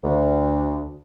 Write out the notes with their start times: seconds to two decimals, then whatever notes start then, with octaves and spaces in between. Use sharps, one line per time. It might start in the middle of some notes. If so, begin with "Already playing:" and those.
0.03 D2